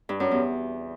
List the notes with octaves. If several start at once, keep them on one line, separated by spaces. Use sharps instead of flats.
G2
F#2
E2